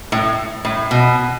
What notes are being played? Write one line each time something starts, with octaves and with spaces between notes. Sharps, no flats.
A2
A2
B2